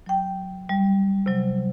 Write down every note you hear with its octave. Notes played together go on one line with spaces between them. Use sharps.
F#3 G5
G3
C3 F#3